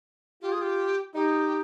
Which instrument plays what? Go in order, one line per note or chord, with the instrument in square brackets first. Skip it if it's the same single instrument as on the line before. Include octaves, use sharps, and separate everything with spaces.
[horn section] F4 [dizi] G4
[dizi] G#4
G4
[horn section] D#4 [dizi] G4